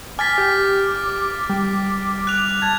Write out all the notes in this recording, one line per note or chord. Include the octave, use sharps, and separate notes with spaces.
G#5 D6 F6 A6 B6
G4
G3
F#6 F7
A5 G#6